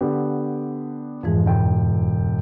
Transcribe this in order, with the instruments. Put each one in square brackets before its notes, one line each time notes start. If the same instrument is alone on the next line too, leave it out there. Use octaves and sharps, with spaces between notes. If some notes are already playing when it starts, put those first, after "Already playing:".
[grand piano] D3 B3 G4
[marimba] F2 G#2 E3 [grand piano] F3 G#3
[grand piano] E1 G5